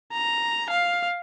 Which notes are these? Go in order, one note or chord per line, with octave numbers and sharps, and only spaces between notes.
A#5
F5